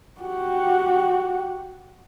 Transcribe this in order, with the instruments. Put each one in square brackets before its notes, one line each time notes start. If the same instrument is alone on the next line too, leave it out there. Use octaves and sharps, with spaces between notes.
[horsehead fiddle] F#4 G4